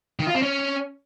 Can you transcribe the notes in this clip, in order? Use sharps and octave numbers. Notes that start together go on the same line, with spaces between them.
D#3
F4
C4
C#4